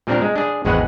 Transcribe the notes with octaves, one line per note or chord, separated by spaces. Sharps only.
A#2 G3 C4 D4 A#4
G#3
D4 G#4
G#1 E2 G#3 G#4 B4 F#5